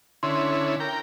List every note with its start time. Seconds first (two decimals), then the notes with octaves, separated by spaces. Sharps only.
0.23 D3 C#4 E4 C6
0.80 A#4 G5